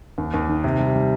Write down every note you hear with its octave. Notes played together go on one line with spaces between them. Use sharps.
D#2
D#2
D#3
C3
G3
G3